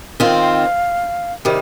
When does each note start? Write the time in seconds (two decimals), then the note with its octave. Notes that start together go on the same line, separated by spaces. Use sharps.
0.20 D#3 C4 F4 F5
1.45 C3 D#3 G3